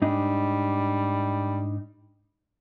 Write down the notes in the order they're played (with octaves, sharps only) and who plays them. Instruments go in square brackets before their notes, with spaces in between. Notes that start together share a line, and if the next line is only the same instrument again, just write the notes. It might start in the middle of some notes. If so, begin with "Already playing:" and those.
[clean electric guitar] G#2 D4 D#4 [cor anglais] G3